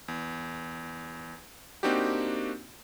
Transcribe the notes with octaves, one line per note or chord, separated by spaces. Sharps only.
E2
A#3 C4 D4 D#4 F#4 G4